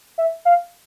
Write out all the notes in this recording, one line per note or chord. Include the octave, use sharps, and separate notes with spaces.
E5
F5